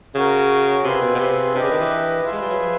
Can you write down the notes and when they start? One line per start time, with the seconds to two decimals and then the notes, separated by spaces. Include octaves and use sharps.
0.15 C#3 C#4 F#4 A#4
0.84 C3 C4 F4 G#4 B4
1.01 B2
1.15 B2
1.19 C3
1.54 C3 D4 G4 B4 D#5
1.63 C#3
1.71 D#3
1.80 E3
2.23 E3 F4 G#4 B4 E5
2.32 G#3
2.42 G3
2.50 F#3
2.58 F3